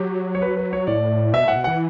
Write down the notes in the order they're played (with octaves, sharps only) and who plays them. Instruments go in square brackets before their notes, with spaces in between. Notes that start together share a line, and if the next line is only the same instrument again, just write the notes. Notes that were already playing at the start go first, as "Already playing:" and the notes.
Already playing: [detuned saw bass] F#3 [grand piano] G4
[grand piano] C#5
B4
B4
C#5
[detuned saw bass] A2 [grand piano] D5
[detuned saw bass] B2 [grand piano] E5
[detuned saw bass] A2 [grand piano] F#5
[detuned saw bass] B2
[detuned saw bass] E3 [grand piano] F#5